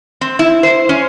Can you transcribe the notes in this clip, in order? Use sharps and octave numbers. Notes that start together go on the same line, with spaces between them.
C4
E4
C5
C#4